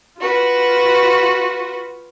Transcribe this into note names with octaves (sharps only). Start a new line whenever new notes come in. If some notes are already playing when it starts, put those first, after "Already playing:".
F4 F#4 B4